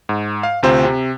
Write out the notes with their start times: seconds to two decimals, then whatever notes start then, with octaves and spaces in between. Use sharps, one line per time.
0.09 G#2
0.43 F5
0.63 D2 C3 C4 F4 C5
0.85 C3